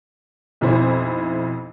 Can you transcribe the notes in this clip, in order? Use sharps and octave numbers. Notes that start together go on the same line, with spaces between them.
B1 F2 E4 C5